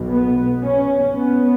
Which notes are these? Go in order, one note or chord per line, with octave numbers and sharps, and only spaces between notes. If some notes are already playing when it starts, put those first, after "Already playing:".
Already playing: B1 B2
B3
C#4
B3